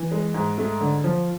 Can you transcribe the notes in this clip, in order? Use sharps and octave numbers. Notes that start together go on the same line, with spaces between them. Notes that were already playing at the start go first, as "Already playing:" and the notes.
Already playing: E3
G#3
G#2
A3
D3
F3